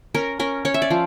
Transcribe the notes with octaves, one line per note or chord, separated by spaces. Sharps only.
C#4 A#4
C#4 A#4
C#4 C#5
E5
D5
F3